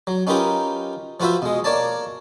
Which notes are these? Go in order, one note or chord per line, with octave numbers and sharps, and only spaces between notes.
F#3
C#4 D#4 F4 G4 A#4 B4
F3 F4 F#4 B4 C5 E5
B2 G#3
A#3 C#5 D5 A5